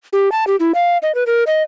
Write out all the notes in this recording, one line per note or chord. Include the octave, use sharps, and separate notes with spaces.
G4
A5
G4
E4
F5
D#5
B4
A#4
D#5